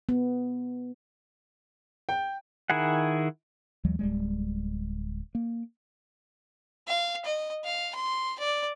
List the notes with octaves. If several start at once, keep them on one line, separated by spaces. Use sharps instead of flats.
B3
G5
D#3 E4 G#4 F#5
D#2 E3 F#3 G#3
D1 G3 G#3
A#3
F5
D#5
F5
C6
D5